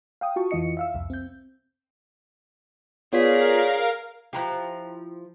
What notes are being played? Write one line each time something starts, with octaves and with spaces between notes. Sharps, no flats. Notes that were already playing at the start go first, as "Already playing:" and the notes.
F5 G5 D#6
F4 F#4 A5 C#6
F2 E3 F4 D#5 C#7
E5 F5 E6
C2 F2
C4 G6
B3 F4 G#4 A#4 C#5 D5 F5 B6
F3 E4 G4 F5 A#5 F#6